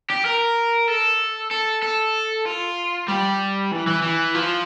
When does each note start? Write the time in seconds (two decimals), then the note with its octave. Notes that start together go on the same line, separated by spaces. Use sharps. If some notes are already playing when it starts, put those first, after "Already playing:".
0.10 G4
0.25 A#4
0.89 A4
1.51 A4
1.83 A4
2.46 F4
3.09 G3
3.72 E3
3.87 E3
4.03 E3
4.35 F3